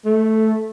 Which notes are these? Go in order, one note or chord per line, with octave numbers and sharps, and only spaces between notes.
A3